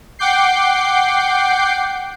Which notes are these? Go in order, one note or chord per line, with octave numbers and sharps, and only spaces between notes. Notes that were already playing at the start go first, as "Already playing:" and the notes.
F#5 G5 D6 G6 C7